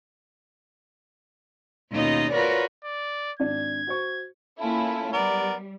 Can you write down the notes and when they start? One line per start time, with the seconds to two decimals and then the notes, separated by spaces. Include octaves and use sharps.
1.92 D#2 B2 C#4 D#4 F4 D#5
2.32 F4 F#4 A#4 B4 C#5 D5
2.84 D5
3.40 G#1 D4 D5 G#6
3.87 F#4 C5 C#6
4.59 A#3 C#4 E4 F4 A4
5.13 G3 B3 A#4 D5